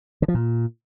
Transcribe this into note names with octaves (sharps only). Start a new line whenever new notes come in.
D3
F3
A#2